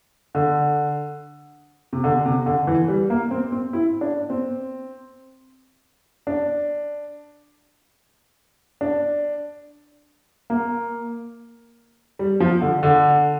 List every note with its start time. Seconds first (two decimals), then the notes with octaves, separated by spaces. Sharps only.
0.35 D3
1.93 C3
2.04 D3
2.25 C3
2.46 D3
2.67 E3
2.88 G3
3.10 A#3
3.31 C4
3.52 C4
3.73 E4
4.01 D4
4.30 C4
6.27 D4
8.81 D4
10.50 A#3
12.19 G3
12.40 F3
12.61 D3
12.83 D3